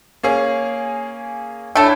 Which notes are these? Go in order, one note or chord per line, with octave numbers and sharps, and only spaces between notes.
A#3 C#4 G#4
A3 D4 E4 A4 C#5 G5 A5